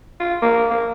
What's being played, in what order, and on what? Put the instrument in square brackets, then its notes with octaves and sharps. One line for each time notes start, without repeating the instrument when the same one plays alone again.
[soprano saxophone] F4
A#3
A#3